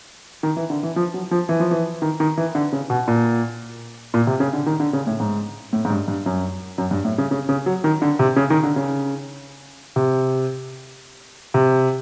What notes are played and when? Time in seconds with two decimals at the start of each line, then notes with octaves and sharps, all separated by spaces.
0.43 D#3
0.57 E3
0.70 D3
0.83 E3
0.96 F3
1.14 F#3
1.31 F3
1.49 E3
1.60 F3
1.71 E3
2.02 D#3
2.20 D#3
2.37 E3
2.55 D3
2.72 C#3
2.90 B2
3.08 A#2
4.14 A#2
4.27 C3
4.40 C#3
4.53 D3
4.66 D#3
4.80 D3
4.93 C#3
5.07 A2
5.20 G#2
5.73 A2
5.85 G#2
5.90 G2
6.08 G2
6.26 F#2
6.78 F#2
6.91 G2
7.05 A2
7.18 C#3
7.31 C#3
7.49 C#3
7.66 F#3
7.84 D#3
8.02 D3
8.19 C3
8.36 C#3
8.50 D#3
8.63 D3
8.76 C#3
9.96 C3
11.54 C3